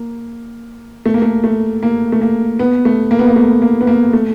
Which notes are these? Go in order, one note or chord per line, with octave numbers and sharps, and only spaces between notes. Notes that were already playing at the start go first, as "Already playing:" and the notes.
Already playing: A#3
A3
A#3
A3
A3
A#3
A3
A#3
B3
A3
A#3
B3
A#3
A3
A#3
B3
A#3
A3